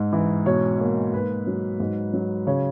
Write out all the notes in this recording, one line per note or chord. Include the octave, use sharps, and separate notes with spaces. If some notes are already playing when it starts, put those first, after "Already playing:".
Already playing: G#2
E3
B2 C#5
A#3 C#5
G#2 B4
F#3
G#2
F#3
C#3 C#5